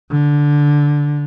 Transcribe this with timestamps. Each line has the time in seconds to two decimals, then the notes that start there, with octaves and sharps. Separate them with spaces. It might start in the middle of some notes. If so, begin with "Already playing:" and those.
0.11 D3